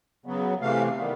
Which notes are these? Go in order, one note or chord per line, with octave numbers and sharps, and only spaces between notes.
C#3 F#3 B3
C3 E3 A3 F5
D#3 G3 B3